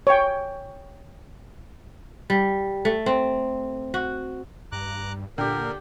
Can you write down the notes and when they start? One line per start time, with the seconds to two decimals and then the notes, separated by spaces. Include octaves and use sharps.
0.07 C#5 G5
2.30 G3
2.85 A3
3.06 C4
3.94 F#4
4.72 G2 A#5 D6 F#6
5.38 A#2 D3 G4 A#4 G5